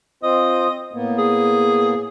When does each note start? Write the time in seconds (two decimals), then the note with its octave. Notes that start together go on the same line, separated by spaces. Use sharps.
0.23 C4 F4 C5 D#5
0.93 A2 A#3 B3
1.18 G#4